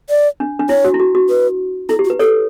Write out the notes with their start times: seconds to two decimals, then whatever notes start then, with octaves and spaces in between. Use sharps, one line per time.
0.10 D5
0.40 D4
0.59 D4
0.69 E4 C#5
0.85 F#4
0.94 E4
1.00 F#4
1.15 F#4
1.29 B4
1.89 E4 A4
1.99 G4
2.04 F#4
2.10 B4
2.19 G4 A4 C#5